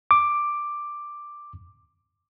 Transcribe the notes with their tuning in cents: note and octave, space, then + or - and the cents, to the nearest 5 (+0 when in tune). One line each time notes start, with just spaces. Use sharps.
D6 +5